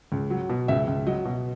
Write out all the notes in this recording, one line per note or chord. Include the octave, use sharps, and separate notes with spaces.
C#2
F#3
B2
C#2 E5
C#2
F#3 D#5
B2